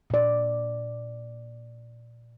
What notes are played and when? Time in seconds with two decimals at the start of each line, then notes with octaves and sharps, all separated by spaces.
0.10 A#2 D5